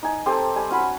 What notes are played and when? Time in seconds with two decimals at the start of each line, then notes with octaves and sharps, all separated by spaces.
0.03 D#4 G#5
0.26 C4 G4 A4 C5
0.56 G3 G#5
0.70 C#4 F#4 B5